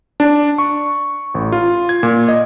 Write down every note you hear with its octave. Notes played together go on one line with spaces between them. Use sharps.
D4
C#6
A1
F4
G#6
A#2
D#5